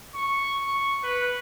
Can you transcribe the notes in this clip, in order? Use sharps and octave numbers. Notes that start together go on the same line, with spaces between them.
C#6
C#6
B4